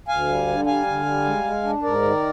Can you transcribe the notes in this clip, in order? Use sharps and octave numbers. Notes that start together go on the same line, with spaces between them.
D2 F5 G#5
G3
D3
G3 F5 G#5
D3
G3
G#3
G#3
D4
G#2 A#4 D5
D#3